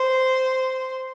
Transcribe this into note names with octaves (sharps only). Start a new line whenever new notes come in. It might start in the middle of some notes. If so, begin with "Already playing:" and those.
Already playing: C5